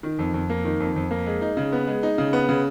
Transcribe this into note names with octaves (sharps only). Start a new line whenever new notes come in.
D#3
F2
F2
A#3
D#3
F2
F2
A#3
G#3
D#4
C#3
B3
G#3
D#4
C#3
B3
C#3